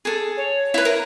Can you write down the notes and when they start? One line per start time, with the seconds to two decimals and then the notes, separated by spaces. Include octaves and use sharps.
0.05 G#4 A4
0.37 C#5
0.74 E4 B4
0.85 A#4